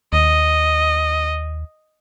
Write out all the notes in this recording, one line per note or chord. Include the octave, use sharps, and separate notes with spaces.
D#2 D#5